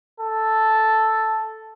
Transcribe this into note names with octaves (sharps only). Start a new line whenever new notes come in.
A4